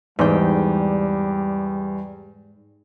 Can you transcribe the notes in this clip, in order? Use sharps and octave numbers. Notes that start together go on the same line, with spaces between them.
E2 G#2 G3 G5